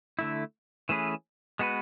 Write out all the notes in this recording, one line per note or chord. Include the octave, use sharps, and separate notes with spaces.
D3 A3 E4
E3 A3 C#4 G#4 B4
G#3 B3 F#4 B4